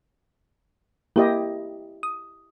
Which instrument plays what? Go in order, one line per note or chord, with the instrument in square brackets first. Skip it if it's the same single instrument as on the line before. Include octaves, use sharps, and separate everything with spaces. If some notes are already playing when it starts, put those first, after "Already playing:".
[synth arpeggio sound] A#3 A#4 [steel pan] E4 G4 D#5
[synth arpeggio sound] D#6